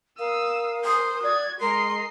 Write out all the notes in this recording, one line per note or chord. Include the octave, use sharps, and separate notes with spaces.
A#4 F5 D#6 E6
C5 D#6
F#4 D5 G#6
G#3 A#4 D#5 C6 C7